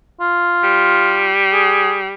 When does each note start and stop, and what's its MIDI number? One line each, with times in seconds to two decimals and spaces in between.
0.21 1.32 65
0.63 2.14 55
1.53 1.95 68